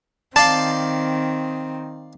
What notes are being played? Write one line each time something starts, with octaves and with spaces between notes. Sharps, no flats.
D#3 C4 D5 F5 A5 C6